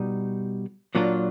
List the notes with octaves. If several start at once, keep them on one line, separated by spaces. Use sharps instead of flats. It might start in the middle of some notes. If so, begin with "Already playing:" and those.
Already playing: B2 G3 D#4
A#2 F#3 A#3 D4 F4